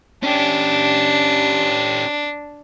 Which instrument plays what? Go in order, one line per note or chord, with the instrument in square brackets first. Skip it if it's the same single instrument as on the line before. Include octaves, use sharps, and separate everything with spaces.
[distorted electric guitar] C#4 G4 [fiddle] D4